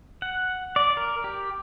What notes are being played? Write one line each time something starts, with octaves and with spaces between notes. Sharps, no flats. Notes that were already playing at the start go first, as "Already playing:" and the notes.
F#5
D5
A#4
G4